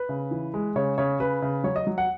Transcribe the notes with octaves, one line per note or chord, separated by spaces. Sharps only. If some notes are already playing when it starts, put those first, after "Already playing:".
Already playing: B4
C#3
E3
G#3
C#3 C#5
C#3 C#5
C#3 B4
C#3
F#3 C#5
D#5
F#3
F#5